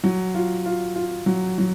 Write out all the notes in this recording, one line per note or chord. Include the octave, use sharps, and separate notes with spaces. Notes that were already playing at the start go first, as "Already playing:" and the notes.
F#3
F4
F4
F4
F#3
F#3